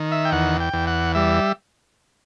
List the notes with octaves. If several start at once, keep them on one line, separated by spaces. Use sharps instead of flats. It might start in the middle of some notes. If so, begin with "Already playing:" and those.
Already playing: D#3
E5
G5
E2 F#5
G5
E2
F#5
G3 E5